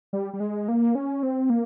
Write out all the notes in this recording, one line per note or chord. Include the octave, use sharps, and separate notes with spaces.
G3
G3
G#3
A#3
C#4
C4
A#3